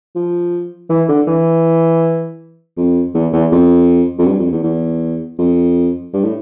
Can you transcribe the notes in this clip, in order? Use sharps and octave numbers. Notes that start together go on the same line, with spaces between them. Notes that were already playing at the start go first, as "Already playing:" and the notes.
F3
E3
D3
E3
F2
E2
E2
F2
F2
G2
F2
E2
E2
F2
G2
A2